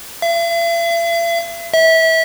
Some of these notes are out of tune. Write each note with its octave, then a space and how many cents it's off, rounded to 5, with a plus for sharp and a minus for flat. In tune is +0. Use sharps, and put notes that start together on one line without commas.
E5 +45
E5 -25